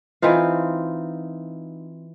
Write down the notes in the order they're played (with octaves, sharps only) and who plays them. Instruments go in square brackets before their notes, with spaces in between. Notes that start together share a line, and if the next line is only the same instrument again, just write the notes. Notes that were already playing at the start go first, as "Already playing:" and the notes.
[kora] E3 C4 D#4 F4